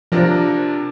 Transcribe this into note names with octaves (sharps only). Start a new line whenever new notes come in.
C3 F3 D4 A#4